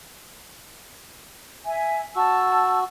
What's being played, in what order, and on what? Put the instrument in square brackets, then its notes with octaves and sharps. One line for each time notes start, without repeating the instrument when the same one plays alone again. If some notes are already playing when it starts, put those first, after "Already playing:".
[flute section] E5 G#5
[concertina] F#4 [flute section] A5 E6